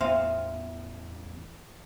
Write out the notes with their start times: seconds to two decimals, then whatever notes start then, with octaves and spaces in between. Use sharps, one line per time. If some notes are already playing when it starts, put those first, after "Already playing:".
0.01 E2 A2 B3 C5 E5 F5 G5